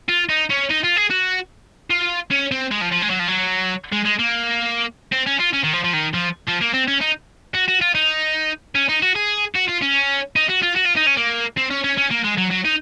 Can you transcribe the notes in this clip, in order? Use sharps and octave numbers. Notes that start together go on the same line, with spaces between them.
F4
D#4
C#4
D#4
F4
G#4
F#4
F4
C#4
C4
G#3
F3
F3
G#3
F#3
F3
F#3
G#3
G#3
A#3
C4
C#4
F4
C#4
D#3
F3
F3
D#3
F3
F3
A#3
C4
C#4
D#4
F#4
F#4
F4
D#4
C#4
D#4
F#4
G#4
F#4
F4
C#4
D#4
F#4
F4
F#4
F4
D#4
C#4
A#3
C4
C#4
C#4
C#4
A#3
G#3
F#3
F#3
D#4